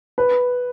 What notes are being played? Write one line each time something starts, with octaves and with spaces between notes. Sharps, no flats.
B4